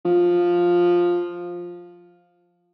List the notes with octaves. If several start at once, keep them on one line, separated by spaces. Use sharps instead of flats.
F3